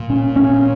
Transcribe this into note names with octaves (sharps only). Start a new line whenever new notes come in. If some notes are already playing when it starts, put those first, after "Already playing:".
Already playing: A#2
C#4
C#4